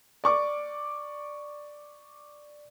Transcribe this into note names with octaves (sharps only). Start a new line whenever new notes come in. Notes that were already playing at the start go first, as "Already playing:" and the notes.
D5 C#6 D6